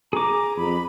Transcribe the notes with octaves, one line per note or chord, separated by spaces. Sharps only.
G#4 A#5 D6
F2 B5